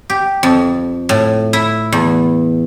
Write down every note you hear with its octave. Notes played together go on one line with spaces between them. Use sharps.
G4
F2
A2
E4
E2